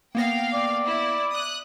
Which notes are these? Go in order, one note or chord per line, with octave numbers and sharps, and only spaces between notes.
A#3 B3 F5 G5 A#6
D5
E4
D#6 F#6